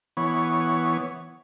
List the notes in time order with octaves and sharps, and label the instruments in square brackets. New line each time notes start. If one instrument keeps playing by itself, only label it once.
[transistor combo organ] E3 B3 C#5